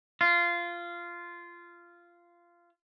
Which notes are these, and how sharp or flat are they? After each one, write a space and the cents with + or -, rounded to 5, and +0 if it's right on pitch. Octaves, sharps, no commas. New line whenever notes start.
F4 -15